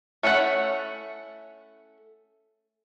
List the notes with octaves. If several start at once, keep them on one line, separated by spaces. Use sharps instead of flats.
A3 C#4 E4 F4 F#5